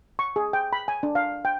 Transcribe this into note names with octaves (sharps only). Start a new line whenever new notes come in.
C#6
G#4
G5
B5
G#5
D4
F5
G5